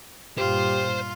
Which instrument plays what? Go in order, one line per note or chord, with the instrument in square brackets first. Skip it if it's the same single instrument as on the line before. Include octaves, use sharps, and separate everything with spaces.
[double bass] G2 A#2 [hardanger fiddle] F4 [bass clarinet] G4 [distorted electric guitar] C5